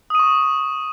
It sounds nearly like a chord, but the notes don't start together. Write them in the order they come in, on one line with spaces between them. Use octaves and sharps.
D#6 D#7 C#6